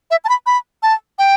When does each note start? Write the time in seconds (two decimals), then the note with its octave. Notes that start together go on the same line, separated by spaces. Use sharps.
0.11 E5
0.24 A5
0.29 B5
0.46 B5
0.83 A5
1.19 G5